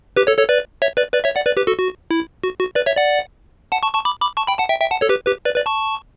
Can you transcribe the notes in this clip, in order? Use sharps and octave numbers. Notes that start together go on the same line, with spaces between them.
G4 B4
A4 C#5
A4 C#5
B4 D5
C#5 E5
B4 D5
B4 D5
C#5 E5
D5 F#5
B4 D5
G4 B4
F#4 A4
F#4
E4
F#4
F#4
B4 D5
C#5 E5
D5 F#5
F#5 A5
A5 C#6
A5 C#6
B5 D6
B5 D6
A5 C#6
G5 B5
F#5 A5
E5 G5
E5 G5
F#5 A5
A4 C#5
G4 B4
G4 B4
B4 D5
B4 D5
A5 C#6